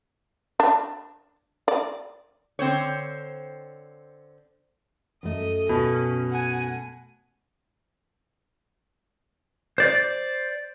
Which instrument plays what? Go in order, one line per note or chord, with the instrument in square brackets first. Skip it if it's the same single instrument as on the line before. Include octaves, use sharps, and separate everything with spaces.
[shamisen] D4
D5
[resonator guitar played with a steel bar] D3 C4 C5 C#5
[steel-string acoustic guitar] F#2 A3 [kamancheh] D#5
[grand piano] B2 [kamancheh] C#4
[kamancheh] F#5 G#5
[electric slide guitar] C5 D5